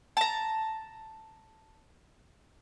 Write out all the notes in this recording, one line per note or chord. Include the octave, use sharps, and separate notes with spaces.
A5 A#5